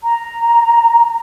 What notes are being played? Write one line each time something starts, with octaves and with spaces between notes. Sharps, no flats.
A#5